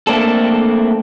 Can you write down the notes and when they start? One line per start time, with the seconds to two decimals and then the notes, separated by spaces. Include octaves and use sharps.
0.07 A3 A#3 C4 D4 A4